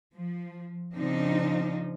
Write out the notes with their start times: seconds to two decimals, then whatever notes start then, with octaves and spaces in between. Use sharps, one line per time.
0.15 F3
0.95 C#3 F3 C4 D4 D#4